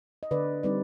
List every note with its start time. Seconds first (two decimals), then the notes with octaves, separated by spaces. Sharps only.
0.23 D#5
0.31 D3 B4 D5
0.63 G3 C4 D#4 B4 D5